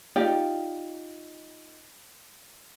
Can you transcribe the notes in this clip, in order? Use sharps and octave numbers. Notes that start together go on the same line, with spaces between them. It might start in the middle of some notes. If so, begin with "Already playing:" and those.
D#4 F4 G4 D5